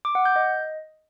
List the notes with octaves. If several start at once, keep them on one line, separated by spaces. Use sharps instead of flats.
D6
F#5
G6
D#5